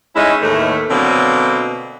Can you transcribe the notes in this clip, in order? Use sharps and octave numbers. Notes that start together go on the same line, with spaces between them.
G#3 A3 C#4 D#4 E4
D#2 A2 E3 A3
B2 D3 F#3 A#3 C4